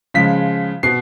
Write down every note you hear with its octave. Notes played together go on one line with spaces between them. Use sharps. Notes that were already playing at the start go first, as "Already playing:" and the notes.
C#3 F3 G#3 B6
B2 C7